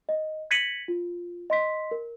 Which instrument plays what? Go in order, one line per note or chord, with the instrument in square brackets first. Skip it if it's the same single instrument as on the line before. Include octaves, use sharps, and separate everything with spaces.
[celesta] D#5
G#6 A#6 B6 C#7 D#7 F#7
F4
D#5 C6 B6
A#4